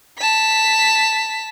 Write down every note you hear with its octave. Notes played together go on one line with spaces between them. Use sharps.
A5 B6